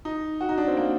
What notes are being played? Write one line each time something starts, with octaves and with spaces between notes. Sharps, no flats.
D#4
F#4
D#4
D4
C4
A#3